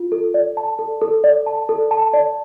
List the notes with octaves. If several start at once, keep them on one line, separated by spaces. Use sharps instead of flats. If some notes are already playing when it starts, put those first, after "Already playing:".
Already playing: F4
A4
D5
A5
A4
A4
D5
A5
A4
A5
D5